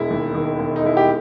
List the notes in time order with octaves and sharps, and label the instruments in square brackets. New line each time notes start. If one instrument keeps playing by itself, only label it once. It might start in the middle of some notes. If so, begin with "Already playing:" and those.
Already playing: [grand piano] E1 G#3 E4
D#2
D#3
E1
D#4
G#3 E4
G4